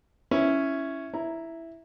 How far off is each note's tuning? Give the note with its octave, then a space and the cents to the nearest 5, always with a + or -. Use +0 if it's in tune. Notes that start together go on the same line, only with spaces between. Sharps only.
C#4 +0 E4 +0
E4 +0 A#5 +0